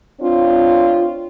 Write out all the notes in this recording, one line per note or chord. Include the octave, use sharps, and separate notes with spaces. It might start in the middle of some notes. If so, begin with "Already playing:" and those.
C4 D4 F4 C#5